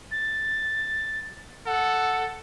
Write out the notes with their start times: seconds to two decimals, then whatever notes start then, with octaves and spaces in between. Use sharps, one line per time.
0.11 A6
1.66 A4 F#5